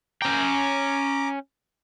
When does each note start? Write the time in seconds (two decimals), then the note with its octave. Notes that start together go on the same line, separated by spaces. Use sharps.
0.22 C#4 G5 A#5 D6